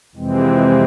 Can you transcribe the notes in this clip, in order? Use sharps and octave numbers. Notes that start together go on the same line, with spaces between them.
F2 C3 E3 G#3 C4